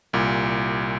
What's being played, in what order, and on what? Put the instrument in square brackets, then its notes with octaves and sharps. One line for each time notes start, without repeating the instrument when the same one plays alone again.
[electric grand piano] C2 A#2